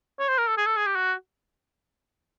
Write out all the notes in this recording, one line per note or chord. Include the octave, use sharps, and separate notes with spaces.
C#5
C5
A#4
A4
G#4
A4
G#4
G4
F#4